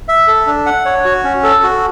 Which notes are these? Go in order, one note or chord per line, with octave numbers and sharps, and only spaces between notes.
E5
A4
D4
F#5
C#5
F#4
C#4
A4
F#4